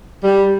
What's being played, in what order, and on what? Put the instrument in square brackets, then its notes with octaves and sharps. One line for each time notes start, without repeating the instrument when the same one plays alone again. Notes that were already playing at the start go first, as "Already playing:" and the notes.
[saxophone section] G3